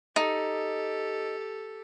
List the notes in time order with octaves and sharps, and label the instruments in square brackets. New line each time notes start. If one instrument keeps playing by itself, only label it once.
[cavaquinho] D#4 [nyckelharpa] G4 A4